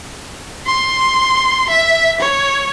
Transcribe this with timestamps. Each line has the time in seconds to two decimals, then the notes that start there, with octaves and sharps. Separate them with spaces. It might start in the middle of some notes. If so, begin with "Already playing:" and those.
0.66 C6
1.70 E5
2.20 C#5